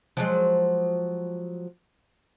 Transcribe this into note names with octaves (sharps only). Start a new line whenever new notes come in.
F3 F#3 G#3